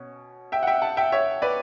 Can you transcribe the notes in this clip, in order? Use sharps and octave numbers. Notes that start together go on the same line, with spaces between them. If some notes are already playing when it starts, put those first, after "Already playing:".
Already playing: B2 C#4
E5 G5
F#5
E5 G5
F#5 A5
E5 G5
C#5 E5
B4 D5